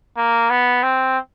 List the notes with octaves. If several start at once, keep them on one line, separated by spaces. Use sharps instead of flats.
A#3
B3
C4